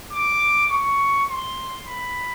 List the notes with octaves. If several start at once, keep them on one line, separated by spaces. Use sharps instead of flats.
D6
C#6
C6
B5